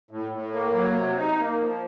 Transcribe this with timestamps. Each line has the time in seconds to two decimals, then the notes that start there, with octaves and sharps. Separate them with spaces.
0.11 A2
0.32 A2
0.53 A#3
0.74 F#3
0.96 C3
1.17 D#4
1.38 A#3
1.59 F3